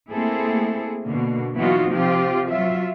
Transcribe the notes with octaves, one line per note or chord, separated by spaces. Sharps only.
A3 A#3 C4 E4 G#4 A4
B2 D3 A#3
E3 F#3 B3 D#4 F4 F#4
C3 F3 C4 F4 G4
F#3 F4 E5